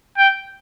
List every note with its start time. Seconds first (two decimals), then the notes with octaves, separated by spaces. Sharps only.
0.18 G5